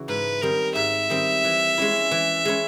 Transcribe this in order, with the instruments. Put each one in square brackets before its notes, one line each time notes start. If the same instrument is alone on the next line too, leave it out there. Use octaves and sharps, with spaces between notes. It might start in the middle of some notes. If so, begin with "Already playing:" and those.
Already playing: [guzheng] C#3 E3 F#4
[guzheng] G#2 [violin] B4
[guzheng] D#3 G3 C4 [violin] A#4
[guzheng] G#2 [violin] E5
[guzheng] D#3 G3 C4
E3
G#3 C#4 E4
E3
G#3 C#4 E4